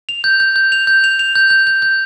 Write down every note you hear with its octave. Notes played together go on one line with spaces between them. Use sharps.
F7
G6
G6
G6
F7
G6
F7
F7
G6
G6
G6
G6